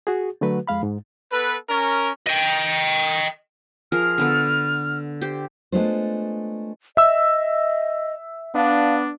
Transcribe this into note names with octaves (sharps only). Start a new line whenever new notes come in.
F#4 G#4
D3 F#3 A3 F#4 B4
F2 G#3 F5 B5
G#2
B3 A4 B4
C#4 A#4
D#5 G5
F3 G#4 A#4 F6
D3 B3 A4
G4 C5
G#3 A3 B3 D4 F4 C5
D#5 E5 E6
B3 D4 F5